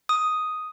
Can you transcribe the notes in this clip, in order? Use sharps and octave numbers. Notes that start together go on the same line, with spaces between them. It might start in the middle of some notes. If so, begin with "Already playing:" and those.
D#6